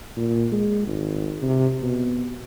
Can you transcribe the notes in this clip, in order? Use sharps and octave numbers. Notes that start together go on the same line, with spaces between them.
A#2
G#3
G#1
C3
B2